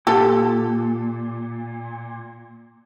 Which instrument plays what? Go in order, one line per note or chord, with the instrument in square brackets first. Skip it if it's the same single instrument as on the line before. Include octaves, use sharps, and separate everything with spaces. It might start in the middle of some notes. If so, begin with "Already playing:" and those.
[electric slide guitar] A#2 [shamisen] G4 A4